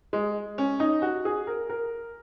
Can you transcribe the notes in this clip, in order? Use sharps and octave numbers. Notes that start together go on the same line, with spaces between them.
G#3
C#4
D#4
F#4
G#4
A#4
A#4